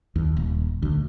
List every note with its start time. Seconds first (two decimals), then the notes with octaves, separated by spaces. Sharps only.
0.16 D#2
0.37 D#1
0.82 D2